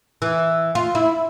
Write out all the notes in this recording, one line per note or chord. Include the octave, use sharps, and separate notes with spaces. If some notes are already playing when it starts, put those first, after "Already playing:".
E3
F4
E4